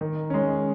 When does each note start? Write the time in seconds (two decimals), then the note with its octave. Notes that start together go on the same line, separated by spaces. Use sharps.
0.01 D#3
0.30 G#3 C#4